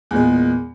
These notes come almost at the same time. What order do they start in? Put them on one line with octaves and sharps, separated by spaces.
E2 A#2 G#3